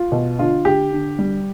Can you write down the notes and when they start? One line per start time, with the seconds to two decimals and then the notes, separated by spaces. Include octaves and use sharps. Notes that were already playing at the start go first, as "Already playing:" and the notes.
Already playing: F4
0.12 B2
0.39 D3 F4
0.65 D3 G4
0.92 D3
1.19 G3